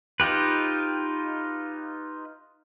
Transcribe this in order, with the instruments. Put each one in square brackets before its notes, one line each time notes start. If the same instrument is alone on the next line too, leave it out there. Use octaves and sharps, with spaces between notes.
[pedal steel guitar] D#4 F4 G4 B4